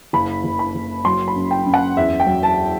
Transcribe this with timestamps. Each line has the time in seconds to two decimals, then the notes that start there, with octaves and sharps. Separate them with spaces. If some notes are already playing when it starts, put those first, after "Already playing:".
0.13 F#1 B5
0.44 F#1
0.59 B5
0.75 F#1
1.05 F#3 C6
1.28 B5
1.36 F#2
1.51 G5
1.66 F#2
1.74 F#5
1.97 E2 E5
2.20 G5
2.27 F#3
2.43 A5